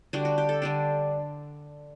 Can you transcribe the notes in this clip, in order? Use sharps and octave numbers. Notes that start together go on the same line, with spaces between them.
D3 G3 D4 F#4
F#4
G4
A4
D3 G3 D4